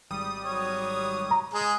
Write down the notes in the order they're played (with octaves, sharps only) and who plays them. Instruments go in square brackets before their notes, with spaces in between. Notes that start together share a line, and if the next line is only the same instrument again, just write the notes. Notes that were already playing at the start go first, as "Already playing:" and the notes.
[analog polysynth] G#1 G3 D#6
[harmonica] F#3 C#5
[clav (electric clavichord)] A#5
[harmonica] G#3 G#4